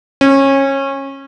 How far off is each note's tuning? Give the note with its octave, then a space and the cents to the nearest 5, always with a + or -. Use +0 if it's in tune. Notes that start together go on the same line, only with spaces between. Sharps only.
C#4 -25